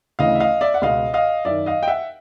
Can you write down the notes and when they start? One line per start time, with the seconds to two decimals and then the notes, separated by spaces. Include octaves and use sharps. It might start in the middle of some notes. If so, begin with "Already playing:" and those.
0.19 D2 C#3 E3 D#5 F5
0.35 E5
0.40 D#5 F5
0.61 D5 E5
0.74 F#5
0.82 C#2 B2 D#5 F5
1.13 D#5 F5
1.45 F#2 D#3 D5 E5
1.66 D#5 F5
1.83 G5
1.87 E5 F#5